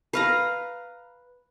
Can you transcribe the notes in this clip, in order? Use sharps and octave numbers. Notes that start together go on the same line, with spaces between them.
B4 F5 A#5